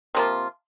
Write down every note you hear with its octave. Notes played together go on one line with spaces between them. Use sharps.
C3 F3 A#3 F4